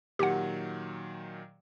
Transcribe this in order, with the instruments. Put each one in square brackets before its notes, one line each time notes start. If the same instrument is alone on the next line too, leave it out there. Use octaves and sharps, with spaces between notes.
[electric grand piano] A#2 D#3 F#3 [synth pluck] G4 F#5